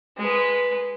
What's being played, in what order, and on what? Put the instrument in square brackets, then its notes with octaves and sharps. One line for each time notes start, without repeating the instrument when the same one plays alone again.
[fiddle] G#3 B4